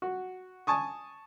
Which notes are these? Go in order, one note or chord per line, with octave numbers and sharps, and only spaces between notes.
F#4
G#5 A5 C#6 D#6